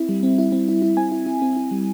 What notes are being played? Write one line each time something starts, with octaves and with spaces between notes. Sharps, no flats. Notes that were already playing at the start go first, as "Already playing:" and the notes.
Already playing: C4 E4 E5
G3
C4
E4
C4
E4
E4
C4 G#5
E4
E4
C4
E4
G3